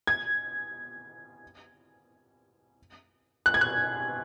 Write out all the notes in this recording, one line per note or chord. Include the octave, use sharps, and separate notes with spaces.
G#6
F#6
G#6
F#6